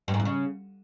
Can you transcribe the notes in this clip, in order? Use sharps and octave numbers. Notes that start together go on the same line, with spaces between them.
G2
G#2
E2
C#3